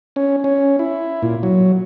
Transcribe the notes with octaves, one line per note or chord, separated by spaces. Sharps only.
C#4
C#4
E4
A#2
F#3